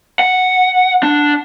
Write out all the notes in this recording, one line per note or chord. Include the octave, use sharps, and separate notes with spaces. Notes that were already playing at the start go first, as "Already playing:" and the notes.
F#5
D4